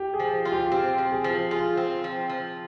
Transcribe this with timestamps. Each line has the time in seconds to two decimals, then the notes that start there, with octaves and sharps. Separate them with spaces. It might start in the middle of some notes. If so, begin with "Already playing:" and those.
Already playing: G4
0.14 G#4
0.20 F3
0.45 F4
0.52 G4
0.72 C4 G4
0.98 F3
1.12 G#4
1.24 F3
1.51 F4 G#4
1.77 C4
2.04 F3
2.29 F3